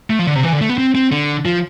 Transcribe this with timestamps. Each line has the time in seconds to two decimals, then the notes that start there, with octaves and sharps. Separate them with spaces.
0.10 A3
0.19 F3
0.27 D3
0.36 C3
0.43 E3
0.53 D3
0.61 A3
0.69 B3
0.78 C4
0.95 C4
1.12 D3
1.45 F3